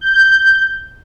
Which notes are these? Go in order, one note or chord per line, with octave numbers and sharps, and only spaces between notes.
G6